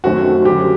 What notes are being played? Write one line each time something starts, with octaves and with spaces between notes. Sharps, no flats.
F#2 D#3 A3 C4 F#4 G4
F#2 D3 G3 G4